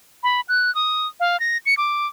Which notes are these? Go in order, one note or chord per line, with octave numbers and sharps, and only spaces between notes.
B5
F#6
D#6
F5
A#6
C#7
D6